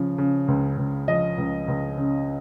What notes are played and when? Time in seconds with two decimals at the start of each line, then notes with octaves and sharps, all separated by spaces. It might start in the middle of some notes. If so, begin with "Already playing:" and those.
Already playing: C#3 F3
0.18 C#3
0.48 C#2
0.77 C#2
1.08 F3 D#5
1.38 C#2
1.68 C#2
1.97 C#3